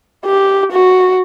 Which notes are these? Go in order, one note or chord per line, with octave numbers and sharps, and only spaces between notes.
G4
F#4